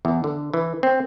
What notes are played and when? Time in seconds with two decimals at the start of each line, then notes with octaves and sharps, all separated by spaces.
0.05 E2
0.24 D3
0.54 E3
0.83 C4